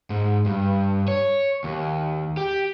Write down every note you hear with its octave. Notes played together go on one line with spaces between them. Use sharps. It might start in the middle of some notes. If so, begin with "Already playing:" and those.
G#2
G2
C#5
D#2
G4